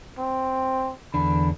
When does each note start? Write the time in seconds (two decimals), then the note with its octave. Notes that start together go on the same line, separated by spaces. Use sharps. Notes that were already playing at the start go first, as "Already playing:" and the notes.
0.18 C4
1.14 E2 D3 D4 B5